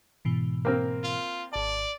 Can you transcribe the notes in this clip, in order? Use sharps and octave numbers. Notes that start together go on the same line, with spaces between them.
G#2 B2 E3
A#3 C4 A#4
F4
G#1 D5 A5